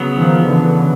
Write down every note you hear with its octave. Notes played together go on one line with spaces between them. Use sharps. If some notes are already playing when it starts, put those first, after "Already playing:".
Already playing: C#3 F#3 B3
D#3 F3
D3 E3